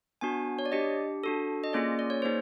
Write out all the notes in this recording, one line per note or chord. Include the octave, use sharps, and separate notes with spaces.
B3 D4 F#4 G#5
C#5
D5
D4 G4 D#5
D4 F#4 A4
D#5
A#3 C#4 F4 G#4 D5
D5
C#5
A#3 D#4 G#4 C5